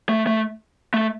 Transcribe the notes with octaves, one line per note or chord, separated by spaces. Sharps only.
A3
A3
A3